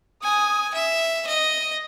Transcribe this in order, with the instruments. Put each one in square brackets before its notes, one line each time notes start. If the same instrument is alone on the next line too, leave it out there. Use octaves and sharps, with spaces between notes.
[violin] G#5 [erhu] D#6
[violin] E5
D#5